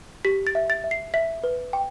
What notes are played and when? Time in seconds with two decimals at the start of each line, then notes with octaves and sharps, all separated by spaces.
0.25 G4 B6
0.47 A6
0.55 E5
0.70 A6
0.84 E5
0.91 C7
1.14 E5 B6
1.44 B4
1.73 G5